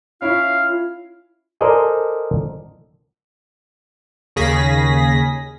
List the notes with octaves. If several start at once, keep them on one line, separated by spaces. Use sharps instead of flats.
C#4 E4 F4 C#5 F5
A4 A#4 C5 D5 D#5 G#5
D#2 C#3 G#4 A#6 B6